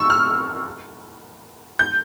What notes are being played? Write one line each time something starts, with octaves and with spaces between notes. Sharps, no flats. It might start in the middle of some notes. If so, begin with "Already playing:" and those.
Already playing: C#6 E6
F6
G6